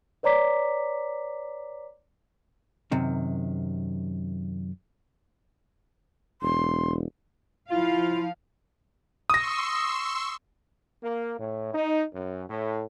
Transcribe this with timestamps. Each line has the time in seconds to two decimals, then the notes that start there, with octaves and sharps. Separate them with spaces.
0.23 B4 C#5 D5 A#5 D6 B6
2.91 F#2 C3 D#3
6.42 E1 C6
7.71 F3 E4 F4 F5
9.30 C6 C#6 D#6 E6 A#6
11.03 A#3
11.39 A2
11.74 D#4
12.14 F#2
12.50 A2